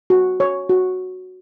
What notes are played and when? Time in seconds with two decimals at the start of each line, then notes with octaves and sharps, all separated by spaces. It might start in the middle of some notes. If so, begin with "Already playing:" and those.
0.10 F#4
0.40 C#5
0.69 F#4